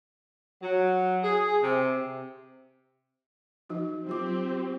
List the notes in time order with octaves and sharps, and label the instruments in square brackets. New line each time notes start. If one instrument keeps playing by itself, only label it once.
[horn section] F#3
G#4
C3
[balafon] F3 D#4 F#4
[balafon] F#3 F4 D6 [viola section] C4 G4